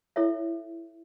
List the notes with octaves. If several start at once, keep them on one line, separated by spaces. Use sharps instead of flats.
E4 A4 C#5 E5